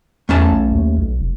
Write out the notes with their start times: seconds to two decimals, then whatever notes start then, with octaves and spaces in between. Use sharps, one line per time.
0.29 E2 A3 C#4 A5
0.52 B1
0.71 D#2
0.98 B1
1.20 F1